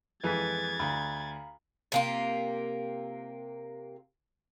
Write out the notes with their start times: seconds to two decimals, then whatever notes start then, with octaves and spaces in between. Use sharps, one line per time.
0.24 F2 E3 G#3 B4 G#5 G#6 A6 B6
0.80 D2 F5 A#5 B5
1.92 C3 A#3 F4